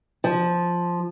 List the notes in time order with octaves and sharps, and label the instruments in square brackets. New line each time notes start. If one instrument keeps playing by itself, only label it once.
[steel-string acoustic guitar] F3